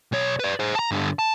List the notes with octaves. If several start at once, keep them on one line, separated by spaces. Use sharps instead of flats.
B1 C#5
B4 D5
G#4 C5
A5 A#5
G2 D3
A5